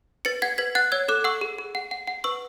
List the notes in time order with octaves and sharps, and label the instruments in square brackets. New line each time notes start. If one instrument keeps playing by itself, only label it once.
[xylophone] B4 A6 C#7
F#5 G#6 B6
B4 G#6 B6
F#5 F#6 A6
C#5 E6 G#6
A4 D6 F#6
F#5 C#6 E6
G#4
G#4
F#5
F#5
F#5
B4 C#6 E6